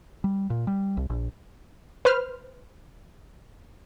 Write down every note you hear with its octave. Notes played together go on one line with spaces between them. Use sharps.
G3
A#2
G3
C2
A#1
B4 C5 F6